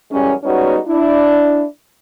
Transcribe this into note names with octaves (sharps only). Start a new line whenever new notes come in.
F#2 E3 G3 G#3 C#4
G3 G#3 B3 C#4 D#4 F#4
D4 E4